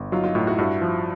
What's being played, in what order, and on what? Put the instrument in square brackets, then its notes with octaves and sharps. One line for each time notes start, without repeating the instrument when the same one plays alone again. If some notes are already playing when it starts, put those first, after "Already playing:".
Already playing: [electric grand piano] G1
[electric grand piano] F#3 [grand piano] D#4 F4
[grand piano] D#4 F4
[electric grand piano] A2 [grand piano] D#4 F4
[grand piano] E4 F#4
[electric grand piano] G2 [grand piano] E4 F#4
[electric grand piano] F3